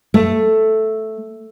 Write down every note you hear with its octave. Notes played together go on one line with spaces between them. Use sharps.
A3